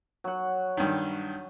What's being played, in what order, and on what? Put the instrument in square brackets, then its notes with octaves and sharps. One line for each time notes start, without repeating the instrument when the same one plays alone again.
[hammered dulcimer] F#3 F#5
[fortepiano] G2 D#3